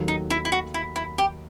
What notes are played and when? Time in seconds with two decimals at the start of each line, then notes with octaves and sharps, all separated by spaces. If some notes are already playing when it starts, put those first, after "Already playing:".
Already playing: D#2 D#3 F#3 A3
0.08 D#4
0.30 E4
0.45 E4
0.52 F#4
0.74 E4
0.96 E4
1.18 G4